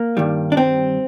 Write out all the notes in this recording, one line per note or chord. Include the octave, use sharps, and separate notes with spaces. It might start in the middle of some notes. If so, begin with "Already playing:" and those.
Already playing: A#3
G2 D#3 G3
D4
C4